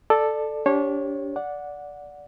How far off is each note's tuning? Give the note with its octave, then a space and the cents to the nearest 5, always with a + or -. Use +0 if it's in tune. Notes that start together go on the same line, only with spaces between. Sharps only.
A4 +0 D5 +20
D4 -35 G4 +0 C#5 -20
D5 -10 F#5 -15